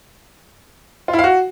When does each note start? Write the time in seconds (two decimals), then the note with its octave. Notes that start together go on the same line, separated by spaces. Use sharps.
1.08 F4
1.13 E4
1.19 F5
1.24 F#4